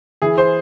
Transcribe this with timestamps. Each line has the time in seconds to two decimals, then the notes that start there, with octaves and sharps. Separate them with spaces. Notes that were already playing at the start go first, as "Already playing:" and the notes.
0.22 E3 G#4
0.38 C5